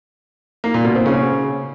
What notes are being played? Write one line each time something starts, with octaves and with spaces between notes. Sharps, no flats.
A#3
A#2
B2
C4
C#3